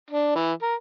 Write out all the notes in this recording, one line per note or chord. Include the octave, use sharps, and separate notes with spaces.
D4
E3
A#4